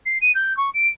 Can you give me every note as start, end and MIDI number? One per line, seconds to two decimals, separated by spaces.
0.05 0.18 96
0.21 0.32 99
0.34 0.56 91
0.57 0.70 85
0.74 0.88 98